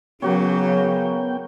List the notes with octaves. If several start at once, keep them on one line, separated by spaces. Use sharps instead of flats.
C#3 F#3 A#3 B3 F#4 C#5 G5